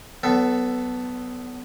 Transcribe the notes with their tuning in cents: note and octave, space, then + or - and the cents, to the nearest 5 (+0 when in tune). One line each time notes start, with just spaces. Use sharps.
F#3 +40 B3 +10 A4 +0